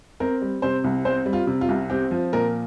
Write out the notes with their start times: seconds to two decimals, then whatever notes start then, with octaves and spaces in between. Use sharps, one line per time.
0.20 C4 A#4
0.42 G3
0.62 C3 C5
0.84 C2
1.05 C4 C5
1.26 G3
1.33 F4
1.47 C3
1.61 F4
1.69 C2
1.90 C4 G4
2.11 F3
2.33 A#2 A#4